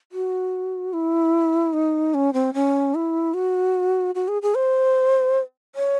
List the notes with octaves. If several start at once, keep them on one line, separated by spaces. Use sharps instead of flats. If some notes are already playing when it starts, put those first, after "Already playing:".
F#4
E4
D#4
C#4
C4
C#4
E4
F#4
F#4
G#4
G#4
C5
C#5